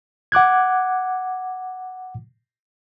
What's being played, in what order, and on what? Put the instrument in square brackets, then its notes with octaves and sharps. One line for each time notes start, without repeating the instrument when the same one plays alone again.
[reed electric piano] F#5 D6 F#6 G#6